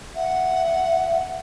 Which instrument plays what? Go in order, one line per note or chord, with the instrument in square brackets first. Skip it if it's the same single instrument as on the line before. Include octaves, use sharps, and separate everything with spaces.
[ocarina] E5 [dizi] F#5